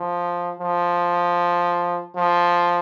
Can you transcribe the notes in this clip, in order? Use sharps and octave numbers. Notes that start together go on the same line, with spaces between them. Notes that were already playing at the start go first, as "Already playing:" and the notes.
Already playing: F3
F3
F3